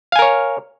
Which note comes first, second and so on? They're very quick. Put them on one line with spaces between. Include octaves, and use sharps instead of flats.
F5 G#5 A#4 C#5